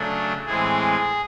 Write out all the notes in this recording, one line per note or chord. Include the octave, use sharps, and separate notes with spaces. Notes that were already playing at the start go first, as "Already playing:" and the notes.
Already playing: C#3 F#3 A3 D4
A2 E3 G#3 C4 G#4